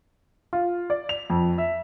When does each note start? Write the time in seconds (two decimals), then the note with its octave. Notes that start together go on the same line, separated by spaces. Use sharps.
0.53 F4
0.90 D5
1.09 F7
1.30 F2
1.58 E5